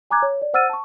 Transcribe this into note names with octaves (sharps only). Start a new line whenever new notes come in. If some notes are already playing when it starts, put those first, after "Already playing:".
G#5 A#5 D6 F#6 G#6
C#5
D5
C5 F#5 E6 F6 A6 D#7
A5 C#6